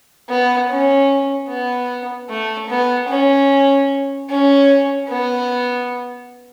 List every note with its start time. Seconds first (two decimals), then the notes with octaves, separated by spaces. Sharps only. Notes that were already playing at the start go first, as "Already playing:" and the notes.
0.29 B3
0.69 C#4
1.48 B3
2.29 A3
2.69 B3
3.09 C#4
4.29 C#4
5.09 B3